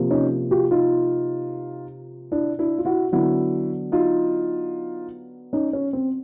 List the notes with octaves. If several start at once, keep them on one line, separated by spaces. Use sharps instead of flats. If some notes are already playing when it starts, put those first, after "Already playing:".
Already playing: C3 F3 A#3
C#4 D#4
F4 G4
D#4 F4
D4 E4
D4 E4
F4
E4 F#4
D3 F#3 B3 E4 F#4
D#4 F4
C#4 D#4
C#4
C4